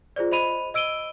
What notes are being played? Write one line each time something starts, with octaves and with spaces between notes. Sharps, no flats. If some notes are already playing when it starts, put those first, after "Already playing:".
F4 G#4 C5 D5
C5 D#5 B5 D#7 F7
D#5 E6 D7 D#7 G7